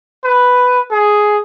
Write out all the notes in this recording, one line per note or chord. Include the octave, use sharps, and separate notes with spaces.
B4
G#4